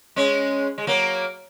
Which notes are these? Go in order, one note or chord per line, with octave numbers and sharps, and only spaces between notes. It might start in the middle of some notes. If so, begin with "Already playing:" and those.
G#3 C#4
G#3
F#3 A#3